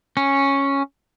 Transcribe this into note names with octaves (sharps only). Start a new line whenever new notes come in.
C#4